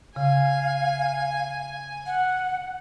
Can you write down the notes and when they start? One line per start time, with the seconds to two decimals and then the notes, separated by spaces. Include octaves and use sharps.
0.16 C#3 F5 G#5
2.06 F#5